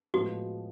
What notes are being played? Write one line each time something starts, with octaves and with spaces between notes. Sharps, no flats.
A2 F3 G#3 B3 F#4